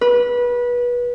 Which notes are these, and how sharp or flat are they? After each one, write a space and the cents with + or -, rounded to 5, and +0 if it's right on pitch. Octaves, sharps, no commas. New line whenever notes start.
B4 -25